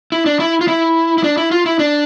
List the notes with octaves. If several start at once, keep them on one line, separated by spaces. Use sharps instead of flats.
E4
D4
E4
F4
E4
E4
D4
E4
F4
E4
D4